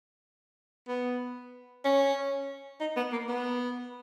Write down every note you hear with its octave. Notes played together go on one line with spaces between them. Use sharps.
B3
C#4
D#4
B3
A#3
B3